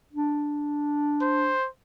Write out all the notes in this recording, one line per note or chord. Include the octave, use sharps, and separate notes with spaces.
D4
C5